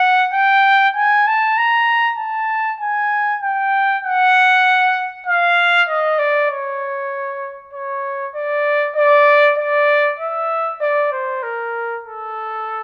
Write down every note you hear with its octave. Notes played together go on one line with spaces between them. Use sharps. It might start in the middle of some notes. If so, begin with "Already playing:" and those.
Already playing: F#5
G5
G#5
A5
A#5
A5
G#5
G5
F#5
F5
D#5
D5
C#5
C#5
D5
D5
D5
E5
D5
C5
A#4
A4